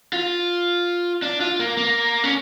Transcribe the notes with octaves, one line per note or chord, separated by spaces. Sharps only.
F4
D4
F4
A#3
A#3
C#4